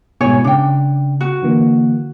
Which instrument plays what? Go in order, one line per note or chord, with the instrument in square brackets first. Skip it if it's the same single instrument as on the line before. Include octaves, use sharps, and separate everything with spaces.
[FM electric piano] G#2 B2 [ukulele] E4 C#5 G#5
[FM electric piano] C#3 [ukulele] D4 G5
[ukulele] F#4
[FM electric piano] D3 E3 A#3